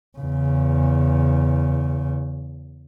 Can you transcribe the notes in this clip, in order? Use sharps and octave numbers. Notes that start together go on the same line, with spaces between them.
E2 C#3